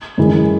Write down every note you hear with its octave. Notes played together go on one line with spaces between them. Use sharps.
F#2 E3 G#3